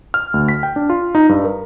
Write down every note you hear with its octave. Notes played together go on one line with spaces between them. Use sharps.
F6
D2
B6
G5
D4
F4
D#4
G2
A#4